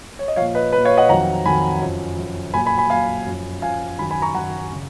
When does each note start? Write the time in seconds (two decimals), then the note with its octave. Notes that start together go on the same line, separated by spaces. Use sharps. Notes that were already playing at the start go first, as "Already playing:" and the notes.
0.19 C#5
0.28 D#5
0.36 F3 C#5 F5
0.41 A#2
0.55 B4 D#5
0.72 A#2 F3 B4
0.85 C#5 F5
0.97 D#5 F#5
1.09 F2 D#3 F#3 F#5 A#5
1.45 F2 D#3 F#3 G#5 B5
1.82 F#2 F3
2.18 F#2 F3
2.54 A#2 F#3 G#5 B5
2.66 G#5 B5
2.78 G#5 B5
2.90 A#2 F#3 F5 G#5
3.26 F#2 F3
3.62 F#2 F3 F5 G#5
3.98 F#2 D#3 F#3 G#5 B5
4.11 G#5 B5
4.22 A#5 C#6
4.34 F#2 D#3 F#3 F#5 A#5
4.73 C#3